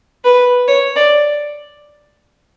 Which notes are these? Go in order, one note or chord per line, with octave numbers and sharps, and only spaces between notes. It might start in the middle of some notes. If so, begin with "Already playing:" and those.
B4
C#5
D5